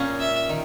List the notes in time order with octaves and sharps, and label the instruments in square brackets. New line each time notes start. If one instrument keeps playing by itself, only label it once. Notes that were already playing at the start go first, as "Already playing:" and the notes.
Already playing: [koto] A#2 A#3 C#4 G#4
[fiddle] E5
[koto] D#3